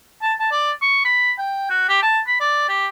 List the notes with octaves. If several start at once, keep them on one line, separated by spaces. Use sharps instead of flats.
A5
A5
D5
C#6
B5
G5
F#4
G4
A5
B5
D5
G4